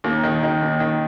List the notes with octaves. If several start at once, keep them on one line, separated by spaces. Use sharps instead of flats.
D#2 A#3
D#3
D#3
D#2
D#3